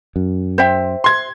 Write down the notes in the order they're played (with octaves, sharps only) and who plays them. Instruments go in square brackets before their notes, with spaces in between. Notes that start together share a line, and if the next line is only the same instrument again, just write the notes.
[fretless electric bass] F#2
[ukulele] C5 E5 G5
[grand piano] C6 G#6